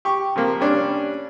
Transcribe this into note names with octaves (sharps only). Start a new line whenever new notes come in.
G4 C#6
C3 F3 A#3
G3 C#4 D4